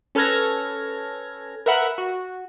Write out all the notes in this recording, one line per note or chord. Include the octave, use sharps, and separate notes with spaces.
C#4 A4 B4 F6 G#6 A#6
A#4 B4 E5 F#5 B5
F#4